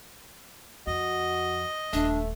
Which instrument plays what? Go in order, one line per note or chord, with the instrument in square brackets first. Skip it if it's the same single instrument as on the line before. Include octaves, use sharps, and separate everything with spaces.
[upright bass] F2 [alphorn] F#4 [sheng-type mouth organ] D#5
[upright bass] D#1 [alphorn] A3 [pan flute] D4